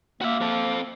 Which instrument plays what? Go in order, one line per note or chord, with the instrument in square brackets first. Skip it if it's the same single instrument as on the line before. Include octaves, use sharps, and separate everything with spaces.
[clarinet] A#3 [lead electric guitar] F#4 E5
[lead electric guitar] C4 A4